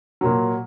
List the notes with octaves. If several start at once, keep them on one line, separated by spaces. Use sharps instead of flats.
A#2 F#3